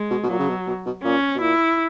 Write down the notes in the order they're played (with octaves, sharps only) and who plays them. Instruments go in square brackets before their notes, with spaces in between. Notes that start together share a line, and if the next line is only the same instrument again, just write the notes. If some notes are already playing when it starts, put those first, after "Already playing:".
Already playing: [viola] G#3
[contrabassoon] B2
B2
[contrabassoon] A#2 [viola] F#3
[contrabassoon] C#3
B2
B2
B2
[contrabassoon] A#2 [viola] C#4
[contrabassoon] B2
[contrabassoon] A#2 [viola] E4